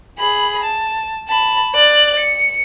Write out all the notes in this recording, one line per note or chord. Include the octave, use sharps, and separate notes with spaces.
G#4 B5
A5
A5 B5
D5 F#6
C#7